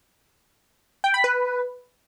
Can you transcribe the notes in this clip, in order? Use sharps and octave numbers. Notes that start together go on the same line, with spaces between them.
G5
B5
B4